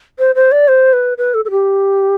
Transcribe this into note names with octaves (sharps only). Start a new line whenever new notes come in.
C5
C5
D5
C5
B4
B4
A4
A4
G4